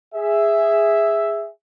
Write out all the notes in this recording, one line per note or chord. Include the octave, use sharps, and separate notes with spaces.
G#4 E5